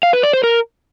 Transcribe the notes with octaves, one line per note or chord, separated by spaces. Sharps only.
F5
B4
D5
C5
A#4